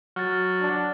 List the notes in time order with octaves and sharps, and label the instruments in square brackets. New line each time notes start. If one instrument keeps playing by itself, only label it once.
[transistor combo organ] F#3 F#4 [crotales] F6 A6
[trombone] D4